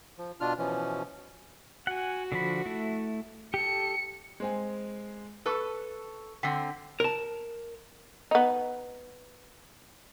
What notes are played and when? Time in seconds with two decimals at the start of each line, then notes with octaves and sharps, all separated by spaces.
0.18 F3
0.41 B2 D4 F4 F6
0.58 B2 E3 F3 C#4
1.87 F#4 F#5 G#5
2.32 D3 F3 B5
2.66 A3 E4
3.54 G4 A4 C#7
4.40 G#3 C4 G#5
5.46 A4 B4 A5 C#6 E6
6.43 D3 C4 F#5 B6 C7
7.00 A#4 A5
8.31 B3 D#4